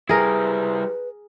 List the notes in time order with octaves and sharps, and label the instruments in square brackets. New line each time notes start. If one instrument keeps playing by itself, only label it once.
[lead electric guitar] G3 E4 [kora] G#4 A#4 [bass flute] B4